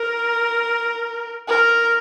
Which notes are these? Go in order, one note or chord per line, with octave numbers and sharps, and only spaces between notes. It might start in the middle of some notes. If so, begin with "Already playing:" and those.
Already playing: A#4
A#4